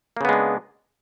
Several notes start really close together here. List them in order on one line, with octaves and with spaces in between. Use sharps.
A#3 C#3 B3 G#3 D4